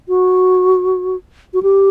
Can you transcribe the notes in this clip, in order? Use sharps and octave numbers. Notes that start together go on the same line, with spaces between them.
F#4
F#4
G4